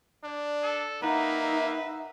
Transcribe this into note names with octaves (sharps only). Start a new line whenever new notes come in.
D4 D5 F#6
A4
A#3 D#4 B4 E5 F#5 A#5 F#6